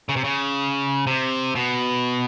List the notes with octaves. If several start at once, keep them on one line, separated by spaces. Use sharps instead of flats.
C#3
C3
C#3
C3
B2